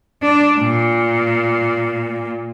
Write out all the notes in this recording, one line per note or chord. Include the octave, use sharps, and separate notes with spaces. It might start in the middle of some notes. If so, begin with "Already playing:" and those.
D4
A#2